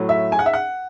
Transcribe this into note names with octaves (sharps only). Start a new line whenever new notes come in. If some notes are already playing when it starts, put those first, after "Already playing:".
Already playing: A2 F#3
E5
G#5
F#5
E5
F#5